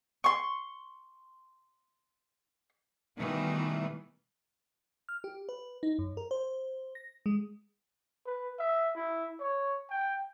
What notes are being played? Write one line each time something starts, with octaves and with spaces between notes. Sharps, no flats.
C6 C#6
B2 D#3 E3 G3 A3
F6
G4
B4
D#4
F#2
A#4
C5
A#6
G#3
B4
E5
E4
C#5
G5